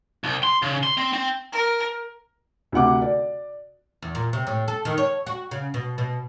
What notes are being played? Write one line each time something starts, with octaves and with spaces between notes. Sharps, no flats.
C2
C6
C#3
C6
C4
C4
A#4
D2 C3 F#5 D6
D5
E2
A#2
C3
A2
A4
D#3
C#5
F#4
C#3
B2
B2